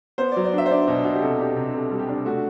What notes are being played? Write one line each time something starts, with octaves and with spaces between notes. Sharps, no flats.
B3 C5
D5
F#3
D5
D4 E5
C5
D4 D5
B2
B2
G4
C3 A4
D4 G4
C3
C3 A4
G3
G4
D4
A3 F#4